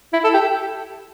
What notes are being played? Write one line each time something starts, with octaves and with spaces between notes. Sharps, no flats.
E4
A4
G4